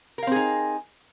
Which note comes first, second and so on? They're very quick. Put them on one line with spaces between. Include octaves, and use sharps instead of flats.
A#4 F5 C4 G#4 D#4